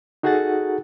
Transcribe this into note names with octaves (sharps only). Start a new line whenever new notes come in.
D#4 F#4 G#4 A4 F#5 A6